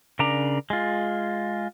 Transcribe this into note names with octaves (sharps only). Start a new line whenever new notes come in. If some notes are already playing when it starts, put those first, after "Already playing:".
C#3 D4 A#4 D5 A#5
G#3 F4